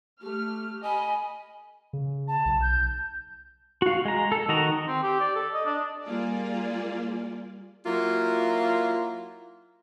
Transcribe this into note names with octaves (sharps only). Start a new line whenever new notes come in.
A3 G4 F6
D#5 G#5 B5
C#3
A5
B1
G6
F#4 F5
G#3 A#5
A4
D#3 F#4 D#5 A#5
C4
G4
D5
A4
D#5
D4
G3 A#3 F4 G#4 D5
F#3 A#3 E4 F4